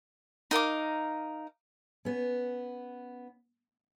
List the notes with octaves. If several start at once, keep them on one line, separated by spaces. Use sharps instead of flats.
D#4 A#4 F5 D6
B3 C#4